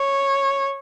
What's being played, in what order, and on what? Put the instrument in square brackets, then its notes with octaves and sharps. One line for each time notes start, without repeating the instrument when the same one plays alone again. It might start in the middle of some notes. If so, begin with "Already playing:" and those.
Already playing: [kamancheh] C#5